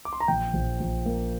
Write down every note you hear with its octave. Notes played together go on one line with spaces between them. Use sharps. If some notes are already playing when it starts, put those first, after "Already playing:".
D6
C6
A#5
A#1 G5
A#1
A#1
A#3